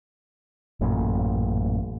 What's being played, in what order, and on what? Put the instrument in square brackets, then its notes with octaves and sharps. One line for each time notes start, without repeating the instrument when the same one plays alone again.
[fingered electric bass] A1 F#2 A#2